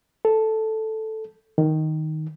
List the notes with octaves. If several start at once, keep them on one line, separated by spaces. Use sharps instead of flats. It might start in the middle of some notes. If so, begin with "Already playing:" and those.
A4
D#3